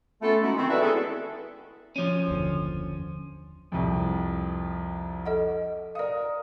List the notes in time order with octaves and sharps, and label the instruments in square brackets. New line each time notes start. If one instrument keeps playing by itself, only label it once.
[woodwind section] A3 B3 C#4 F4 A4
G#3 B3 C#4 D#4 E4 F#4
D#3 C4
E4 F#4 A4 B4 D5 E5
B3 C#4 E4 G#4 A4
[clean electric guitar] F3 C#4
[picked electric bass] F#1 D#2 D3
[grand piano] C2 F2
[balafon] A4 D#5 F#5
[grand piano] A#4 D#6 [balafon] D5 F5